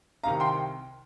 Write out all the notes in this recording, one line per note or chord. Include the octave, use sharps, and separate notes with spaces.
C2 C3 D#3 F5 A#5
G5 C6